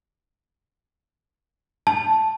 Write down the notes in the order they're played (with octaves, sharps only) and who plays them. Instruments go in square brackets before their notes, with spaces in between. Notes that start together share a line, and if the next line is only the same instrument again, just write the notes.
[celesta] A5